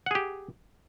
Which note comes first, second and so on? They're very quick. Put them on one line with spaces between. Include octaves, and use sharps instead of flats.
F#5 G#4 G4